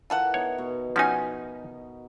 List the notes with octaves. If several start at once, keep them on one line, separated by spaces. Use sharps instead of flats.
E3 F4 A4 A#4 F#5
B3 D#4 C#5
B2
F3 C#4 D#4 F#4 G#5